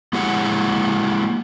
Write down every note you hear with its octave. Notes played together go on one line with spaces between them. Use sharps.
G#3 A#3 E4 G4 C#5 F#5